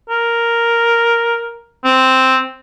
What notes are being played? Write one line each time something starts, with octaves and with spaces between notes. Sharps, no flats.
A#4
C4